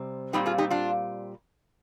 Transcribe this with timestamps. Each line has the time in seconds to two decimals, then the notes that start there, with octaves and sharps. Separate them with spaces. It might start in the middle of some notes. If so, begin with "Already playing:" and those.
Already playing: C3 G3 C4
0.33 A#2 G3 C4 D#4 G4
0.46 F4 G#4
0.58 D#4 G4
0.71 D4 F4